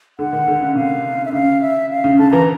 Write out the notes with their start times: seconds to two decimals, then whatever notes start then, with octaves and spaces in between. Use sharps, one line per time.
0.19 D3 F#5
0.33 D#3
0.48 D3
0.61 C#3
0.75 C3 F5
1.25 E5
1.33 C#3 F5
1.61 E5
1.90 F5
2.04 C#3
2.19 D3 A5
2.31 E3 A#5